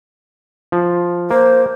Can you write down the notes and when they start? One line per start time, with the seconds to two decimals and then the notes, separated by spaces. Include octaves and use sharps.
0.72 F3
1.31 A#3 C5